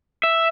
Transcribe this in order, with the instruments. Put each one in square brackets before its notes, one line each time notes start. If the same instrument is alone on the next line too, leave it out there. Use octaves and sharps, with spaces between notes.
[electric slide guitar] E5